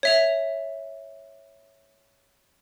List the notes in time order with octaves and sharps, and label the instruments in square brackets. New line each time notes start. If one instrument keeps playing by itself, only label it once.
[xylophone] C#5 E5 F7